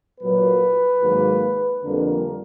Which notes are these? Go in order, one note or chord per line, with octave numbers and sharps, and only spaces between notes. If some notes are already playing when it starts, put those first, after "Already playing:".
A#2 F#3 A#3 B4
G#2 D#3 F#3 A#3
F2 D3 G3 A#3 A#4